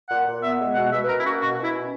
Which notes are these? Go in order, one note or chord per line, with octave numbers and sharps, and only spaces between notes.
A#2 F#5
A#2
B3 E5
G#3
B2 F#5
B2 E5
B4
C#4 A#4
E4
A#3 F#4
B2 F#4
B2
E4
C#4